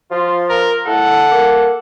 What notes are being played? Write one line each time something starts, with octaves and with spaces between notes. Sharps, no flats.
F3 F4
A#4
A2 A4 F#5
A#3